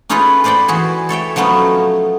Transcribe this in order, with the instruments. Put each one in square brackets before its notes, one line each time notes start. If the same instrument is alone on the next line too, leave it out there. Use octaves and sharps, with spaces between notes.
[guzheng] C#4 D#4 F4 G#4 A4 B4
B4 C5 D5 F#5 G5
E3 F#4 G#4
A4 C#5 E5 G5
F3 F#3 A3 B3 C#4 D#4